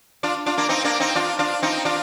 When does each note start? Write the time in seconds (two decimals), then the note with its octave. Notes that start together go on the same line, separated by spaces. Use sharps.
0.23 D4 F4
0.46 D4 F4
0.57 A#3 D4
0.69 C4 D#4
0.84 A#3 D4
1.00 C4 D#4
1.15 D4 F4
1.39 D4 F4
1.62 C4 D#4
1.85 D4 F4